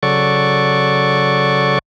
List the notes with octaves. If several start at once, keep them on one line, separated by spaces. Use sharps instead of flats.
C#3 F#3 A4 D5 C#6